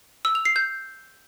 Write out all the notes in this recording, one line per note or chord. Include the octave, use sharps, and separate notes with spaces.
E6
F7
C7
G6